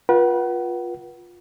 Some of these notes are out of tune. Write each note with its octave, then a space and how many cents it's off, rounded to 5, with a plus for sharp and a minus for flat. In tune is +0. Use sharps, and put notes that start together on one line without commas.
F4 +15 B4 -35 F#5 +30